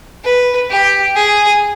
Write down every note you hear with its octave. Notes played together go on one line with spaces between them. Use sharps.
B4
G4
G#4